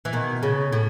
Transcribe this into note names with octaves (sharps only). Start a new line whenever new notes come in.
E3
B2 D#3
C#3
A2